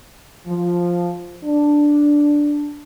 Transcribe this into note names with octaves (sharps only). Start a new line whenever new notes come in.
F3
D4